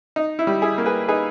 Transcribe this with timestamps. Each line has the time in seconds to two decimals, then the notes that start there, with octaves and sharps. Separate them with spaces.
0.16 D#4
0.39 E4
0.47 G3
0.62 E4 G#4
0.78 A#3
0.86 G#4 B4
1.08 D#4 G#4 B4